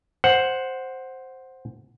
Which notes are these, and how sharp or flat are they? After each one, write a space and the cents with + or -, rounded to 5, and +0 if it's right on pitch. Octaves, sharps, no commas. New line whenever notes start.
C5 +5 F#5 +0